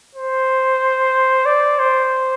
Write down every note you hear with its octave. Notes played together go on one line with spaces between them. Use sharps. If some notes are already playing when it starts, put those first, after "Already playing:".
C5
D5
C5